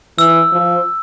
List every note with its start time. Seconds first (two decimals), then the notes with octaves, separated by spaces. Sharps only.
0.18 E3 E6
0.52 F3